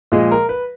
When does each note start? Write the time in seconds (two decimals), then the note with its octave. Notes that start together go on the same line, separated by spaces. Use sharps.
0.12 A#2 F3 G#3 D#5
0.32 A#4
0.49 B4